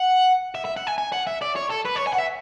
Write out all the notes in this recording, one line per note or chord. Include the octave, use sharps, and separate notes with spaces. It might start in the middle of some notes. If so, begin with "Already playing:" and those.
Already playing: F#5
E5
E5
F#5
G#5
G#5
F#5
E5
D5
C#5
A4
B4
C#5
G#5
F#5
E5